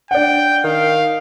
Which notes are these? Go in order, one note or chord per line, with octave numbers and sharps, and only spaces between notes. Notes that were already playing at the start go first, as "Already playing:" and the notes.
D4 F#5 G5
D#3 F5